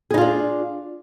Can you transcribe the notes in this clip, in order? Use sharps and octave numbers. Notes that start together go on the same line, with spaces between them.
D4 D#4 F4 G#4